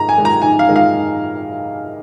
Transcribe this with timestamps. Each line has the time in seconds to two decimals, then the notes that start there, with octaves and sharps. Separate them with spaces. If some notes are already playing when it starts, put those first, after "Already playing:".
Already playing: G#2 D#3 G#3 A#5
0.09 G#5
0.17 D#3 G#3
0.25 A#5
0.42 G#2 G#5
0.59 F5
0.68 D#3 G#3
0.76 F5
0.93 G#2